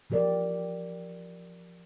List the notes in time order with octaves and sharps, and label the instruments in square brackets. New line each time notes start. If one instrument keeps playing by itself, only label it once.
[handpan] E3 F3 G4 A#4 D5